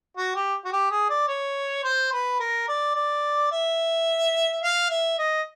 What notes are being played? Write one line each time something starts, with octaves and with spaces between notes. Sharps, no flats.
F#4
G4
F#4
G4
G#4
D5
C#5
C5
B4
A#4
D5
D5
E5
F5
E5
D#5